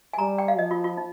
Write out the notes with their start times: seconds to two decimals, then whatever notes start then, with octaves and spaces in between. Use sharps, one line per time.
0.13 G#5
0.18 G3 A#5
0.38 G5
0.48 F5
0.58 F3 D#5
0.71 F4
0.84 F4
0.97 D#4